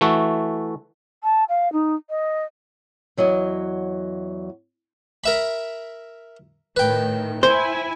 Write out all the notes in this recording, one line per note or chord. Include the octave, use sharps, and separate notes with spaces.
E3 A3 F#4 A4
A5
F5
D#4
D#5
E2 F#3 F#4 D#5
A#4 E5 B5
A2 D#3 B4 G5
E4 C5 G#5